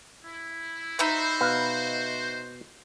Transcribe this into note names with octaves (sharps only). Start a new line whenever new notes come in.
E4
D#4 F#4 C5 E5 B5
B2 B4 F5